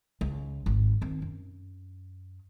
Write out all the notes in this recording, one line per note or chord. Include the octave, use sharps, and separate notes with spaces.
C#2
G#1
D#3 C4
F#2